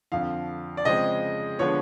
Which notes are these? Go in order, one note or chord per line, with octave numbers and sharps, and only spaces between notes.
F2 D3 F3 F5
D5
C#3 F3 G#3 C4 D#5
D3 F3 G#3 B3 C#5